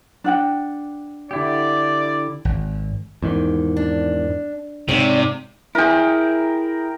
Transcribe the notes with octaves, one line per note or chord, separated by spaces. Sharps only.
D4 F#5 G5
D3 E4 G4 D5
G#1
E2 G#2 D#3
D4
G#2 C3 C#5 D5
E4 G#4 A#4 G5